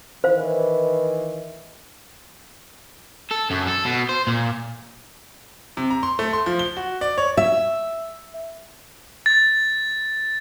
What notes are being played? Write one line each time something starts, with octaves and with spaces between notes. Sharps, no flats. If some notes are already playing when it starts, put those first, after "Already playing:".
D#3 E3 C5 F5
A4
F#2
A4
B2
C5
A#2
C3
A#5
C6
A3
C6
F3
G7
F#4
D5
C#5
E5
A6